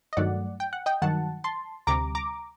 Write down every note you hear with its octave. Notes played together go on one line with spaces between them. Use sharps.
D#5
G2 D#3 F#3 A3 D5 F#5
G5
F#5
D#5 G5
G2 D#3 F#3 F#5 A5
A5 C6
D2 C3 G3 A#5 D6
A#5 D6